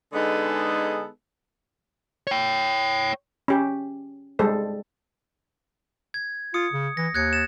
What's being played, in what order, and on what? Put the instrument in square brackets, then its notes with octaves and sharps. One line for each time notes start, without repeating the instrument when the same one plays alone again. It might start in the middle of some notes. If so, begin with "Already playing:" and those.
[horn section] D3 G#3 B3 D#4 G#4 A4
[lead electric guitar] C#5 G5
[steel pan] C#4 G4
G3 G#3 A4 C5
[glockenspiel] G#6
[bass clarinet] F4 [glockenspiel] D#6 C#7
[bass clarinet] C#3
[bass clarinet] E3 [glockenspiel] A#6
[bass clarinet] D#2 [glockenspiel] F#6 G#6 C#7
[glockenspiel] A6 E7